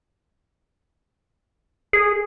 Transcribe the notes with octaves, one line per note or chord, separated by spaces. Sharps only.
G#4